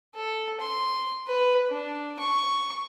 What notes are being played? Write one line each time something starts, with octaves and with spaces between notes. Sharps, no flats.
A4
C6
B4
D4
C#6